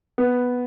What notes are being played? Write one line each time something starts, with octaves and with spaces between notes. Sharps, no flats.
B3